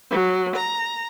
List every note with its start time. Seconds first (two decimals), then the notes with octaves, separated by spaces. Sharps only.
0.11 F#3
0.56 A#5